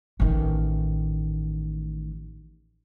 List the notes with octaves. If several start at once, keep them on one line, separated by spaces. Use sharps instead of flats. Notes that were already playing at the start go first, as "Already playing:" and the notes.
A1 D#3